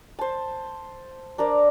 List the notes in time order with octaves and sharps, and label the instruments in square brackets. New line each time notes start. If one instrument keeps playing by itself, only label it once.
[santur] C5 A5
D4 A#4 C5 D5